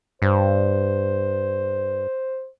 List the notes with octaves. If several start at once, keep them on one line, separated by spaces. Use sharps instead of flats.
G2 C5